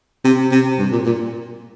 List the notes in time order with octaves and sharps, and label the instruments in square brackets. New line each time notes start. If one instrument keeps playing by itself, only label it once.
[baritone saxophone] C3
C3
G2
A#2
A#2